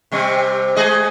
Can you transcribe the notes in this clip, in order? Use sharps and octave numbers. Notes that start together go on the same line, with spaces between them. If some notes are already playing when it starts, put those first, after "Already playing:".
C3 G3 C4
G#3 G#4 D#5